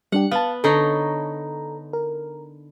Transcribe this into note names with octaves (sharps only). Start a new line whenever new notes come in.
G3 D4 G4 F#5
B3 F5 A5
D3 D#4 A4 C#5 A#5
A#4